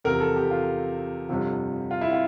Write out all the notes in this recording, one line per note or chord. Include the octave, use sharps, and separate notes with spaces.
E2 C3 F3 A#4
A4
G4
F4
G1 F2 C3 F3
F4
E4
F4